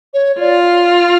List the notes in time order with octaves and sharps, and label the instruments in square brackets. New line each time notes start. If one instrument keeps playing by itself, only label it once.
[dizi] C#5
[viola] F4 [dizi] D5